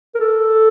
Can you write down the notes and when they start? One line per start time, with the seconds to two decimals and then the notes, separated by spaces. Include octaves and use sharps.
0.15 A#4
0.20 A4